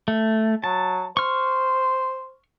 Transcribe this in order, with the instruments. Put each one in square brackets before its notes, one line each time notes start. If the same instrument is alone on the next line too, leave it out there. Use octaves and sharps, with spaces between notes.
[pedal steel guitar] A3
[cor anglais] F#3 [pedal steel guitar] A5
[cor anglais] C5 [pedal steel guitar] C#6 F6